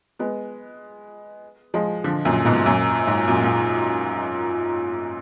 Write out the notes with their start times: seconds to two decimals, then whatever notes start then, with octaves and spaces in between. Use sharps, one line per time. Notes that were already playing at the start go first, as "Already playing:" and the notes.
0.19 G#3 B3
1.74 F3 G#3
2.04 D3 F3
2.25 F#2 A#2
2.45 G#2 B2
2.66 F#2 A#2
3.07 G#2
3.28 F#2 A#2
3.43 A#2